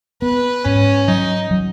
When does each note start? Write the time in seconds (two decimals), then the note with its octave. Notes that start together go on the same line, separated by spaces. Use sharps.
0.22 B3 B4
0.65 G#2 C#4
1.08 F#3 D#4
1.51 F#3